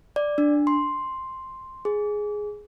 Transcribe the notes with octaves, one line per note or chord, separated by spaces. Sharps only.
D5
D4
C6
G#4